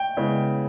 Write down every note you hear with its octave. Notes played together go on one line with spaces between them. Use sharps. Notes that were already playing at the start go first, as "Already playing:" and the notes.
Already playing: G5
C#3 G#3 B3 E4